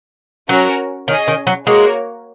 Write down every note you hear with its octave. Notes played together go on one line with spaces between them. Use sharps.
F#3 C#4 F#4 A#4
D#3 C#4 G#4 D#5
D#3
F#3
G#3 A#3 F#4 A#4 C#5